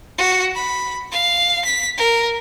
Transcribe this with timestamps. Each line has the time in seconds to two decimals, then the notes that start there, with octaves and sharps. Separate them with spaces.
0.18 F#4
0.55 B5
1.12 F5
1.65 B6
1.97 A#4